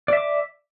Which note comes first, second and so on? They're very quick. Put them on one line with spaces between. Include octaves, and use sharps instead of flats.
D5 E5 D6